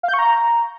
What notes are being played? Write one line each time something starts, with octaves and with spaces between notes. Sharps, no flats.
F5
G6
C#6
A#5